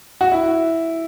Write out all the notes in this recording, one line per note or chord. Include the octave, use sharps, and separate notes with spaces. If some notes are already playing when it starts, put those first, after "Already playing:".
F#4
E4